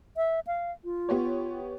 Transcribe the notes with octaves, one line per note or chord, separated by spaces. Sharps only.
E5
F5
F4
B3 G4 C#5